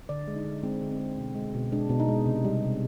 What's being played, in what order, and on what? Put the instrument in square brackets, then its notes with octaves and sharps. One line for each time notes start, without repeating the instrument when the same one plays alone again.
[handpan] D3 D5
G#3
D#4
D3
G#3 C4
D3
C4
G#3
B2
G#3
B2
G#3 D4
B2
D#4
G#3
C3
G3
C3